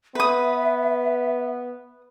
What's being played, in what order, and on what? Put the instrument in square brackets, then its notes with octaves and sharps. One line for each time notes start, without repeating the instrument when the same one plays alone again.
[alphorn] B3 [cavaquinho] B4 D#6 [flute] E5